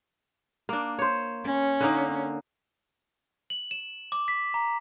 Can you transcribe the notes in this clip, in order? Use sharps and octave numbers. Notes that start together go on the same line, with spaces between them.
A#3 D4
C5 C#5
C#4
D3 A#3 D#4
F#7
E7
D6
B6
A#5